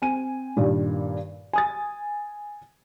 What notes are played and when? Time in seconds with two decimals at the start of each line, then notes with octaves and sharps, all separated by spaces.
0.02 C4 G#5 D#7
0.57 G2 A#2 D#3 G3
1.53 G#5 D#6 A6